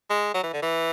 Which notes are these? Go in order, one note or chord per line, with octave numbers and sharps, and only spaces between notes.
G#3
F#3
E3
D3
E3